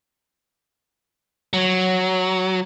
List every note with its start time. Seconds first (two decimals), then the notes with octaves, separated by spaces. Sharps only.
1.53 F#3